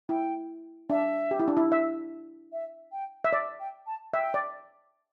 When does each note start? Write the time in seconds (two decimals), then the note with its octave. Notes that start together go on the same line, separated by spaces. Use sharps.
0.09 E4 G5
0.90 D4 E5
1.31 G4
1.40 E4
1.48 D4
1.57 E4
1.72 E5
2.53 E5
2.92 G5
3.24 E5
3.33 D5
3.60 G5
3.87 A5
4.13 E5 G5
4.34 D5